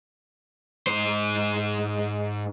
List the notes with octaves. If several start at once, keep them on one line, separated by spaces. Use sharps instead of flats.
G#2 C5